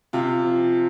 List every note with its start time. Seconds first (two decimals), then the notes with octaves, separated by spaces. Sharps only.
0.13 C3 F4
0.45 F3